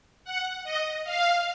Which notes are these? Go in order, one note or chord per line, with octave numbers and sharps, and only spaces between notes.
F#5
D#5
F5